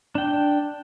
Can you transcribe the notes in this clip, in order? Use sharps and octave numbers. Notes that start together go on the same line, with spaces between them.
D4 G5